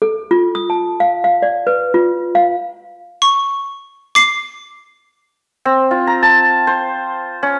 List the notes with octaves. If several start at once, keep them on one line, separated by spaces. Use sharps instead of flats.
A4
F4
D#6
A5
F5
F5
D5
B4
F4
F5
C#6
D6 C7
C4
F4
A#5
A5
C5
C#4